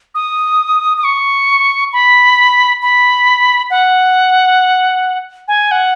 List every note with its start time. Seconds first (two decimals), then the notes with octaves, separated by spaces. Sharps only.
0.15 D#6
0.98 D#6
1.04 C#6
1.93 B5
2.82 B5
3.70 F#5
5.48 G#5
5.71 F#5